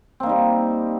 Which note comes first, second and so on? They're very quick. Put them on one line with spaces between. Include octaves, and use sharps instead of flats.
C4 A#3 D#4 G3